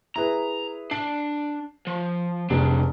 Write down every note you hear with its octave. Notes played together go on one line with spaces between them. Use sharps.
E4 G#4 B4 A#5
D4 C7
F3
F1 C2 D4 G#4